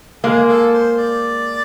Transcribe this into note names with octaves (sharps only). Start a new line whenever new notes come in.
G#3 A#3 G#4
A4
C5
D5